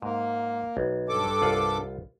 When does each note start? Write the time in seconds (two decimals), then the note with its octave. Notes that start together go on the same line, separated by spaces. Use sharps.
0.02 G#2 A#3
0.77 B1
1.09 G2 A4 D6
1.42 C2 F4 F#5